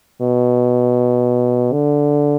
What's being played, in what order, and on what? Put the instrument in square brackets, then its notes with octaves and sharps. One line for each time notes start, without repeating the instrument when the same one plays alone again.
[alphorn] B2
D3